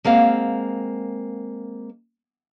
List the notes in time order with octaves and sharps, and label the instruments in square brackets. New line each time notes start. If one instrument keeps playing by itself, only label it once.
[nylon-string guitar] G#3 A#3 C4 F5 F#5